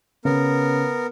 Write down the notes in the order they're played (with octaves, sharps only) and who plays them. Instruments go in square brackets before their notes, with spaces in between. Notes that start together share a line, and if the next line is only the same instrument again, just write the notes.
[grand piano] C#3 [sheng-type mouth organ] B3 A#4